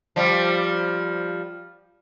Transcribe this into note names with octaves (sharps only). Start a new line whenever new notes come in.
F3 G3